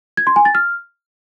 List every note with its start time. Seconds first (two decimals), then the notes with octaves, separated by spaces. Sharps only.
0.17 G#6
0.27 C6
0.36 G#5
0.45 A6
0.55 F6